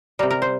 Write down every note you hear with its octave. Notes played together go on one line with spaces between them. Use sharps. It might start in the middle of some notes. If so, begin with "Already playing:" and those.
C3 G3 A#4
A#4
C5